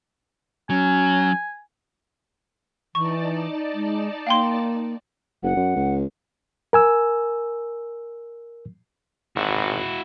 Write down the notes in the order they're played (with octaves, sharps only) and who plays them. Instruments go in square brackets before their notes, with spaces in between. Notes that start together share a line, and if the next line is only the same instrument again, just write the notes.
[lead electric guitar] F#3 [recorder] C#4 [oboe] G#5
[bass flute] E3 [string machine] D#4 D5 A5 [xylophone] C#6
[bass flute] G#3
[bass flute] A#3 [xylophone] F5 G5 C6
[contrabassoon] F#1 [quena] F#5
[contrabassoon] F#2
C#2
[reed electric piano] A#4 G#5 E6
[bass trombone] G#1 [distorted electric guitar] E4 F#4